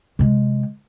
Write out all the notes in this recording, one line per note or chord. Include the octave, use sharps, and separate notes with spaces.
C3 G#3